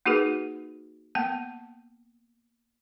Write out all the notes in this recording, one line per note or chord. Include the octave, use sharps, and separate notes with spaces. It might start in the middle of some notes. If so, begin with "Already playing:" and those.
A#3 D#4 F#4 G#4 A#4 B4
A#3 B3 G5 A5